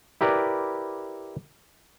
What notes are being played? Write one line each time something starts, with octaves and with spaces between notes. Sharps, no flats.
E4 G4 A#4 B4 D5